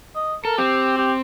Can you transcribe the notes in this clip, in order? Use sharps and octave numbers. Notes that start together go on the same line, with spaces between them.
D#5
A4 A#4
C4 G4
G4